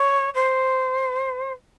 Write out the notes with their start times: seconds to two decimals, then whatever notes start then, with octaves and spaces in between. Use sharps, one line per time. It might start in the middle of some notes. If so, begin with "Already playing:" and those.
Already playing: C#5
0.34 C5